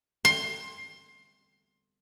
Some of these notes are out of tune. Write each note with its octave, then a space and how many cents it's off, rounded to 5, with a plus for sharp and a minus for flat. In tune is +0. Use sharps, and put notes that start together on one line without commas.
C6 +20